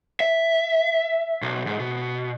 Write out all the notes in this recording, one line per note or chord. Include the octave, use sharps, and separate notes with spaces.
E5
B1
G#2
B2